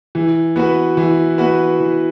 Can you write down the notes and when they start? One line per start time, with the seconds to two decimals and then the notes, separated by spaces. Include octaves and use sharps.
0.15 E3
0.56 B3 F#4 B4
0.97 E3
1.38 B3 F#4 B4
1.80 E3